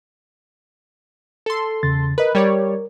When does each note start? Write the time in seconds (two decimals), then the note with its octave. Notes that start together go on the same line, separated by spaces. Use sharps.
1.46 A4 C6
1.83 E2 C#3 A6
2.18 A#4 B4 D#5
2.35 G3 A#4 C#5 D5